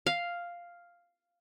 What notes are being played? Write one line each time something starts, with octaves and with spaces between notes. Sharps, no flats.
F5